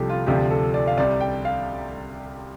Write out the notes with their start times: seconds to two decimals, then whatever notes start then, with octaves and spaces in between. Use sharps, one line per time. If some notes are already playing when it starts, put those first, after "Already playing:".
Already playing: C2 C3 F3 D4 G4 A4
0.10 F4
0.27 D2 C3 F3 D4 F4 G4
0.51 A4
0.74 D5
0.87 F5
0.97 C2 C3 G3 D5
1.21 G5
1.45 F5